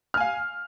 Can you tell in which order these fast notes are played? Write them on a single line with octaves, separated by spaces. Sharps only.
F6 G#5 F5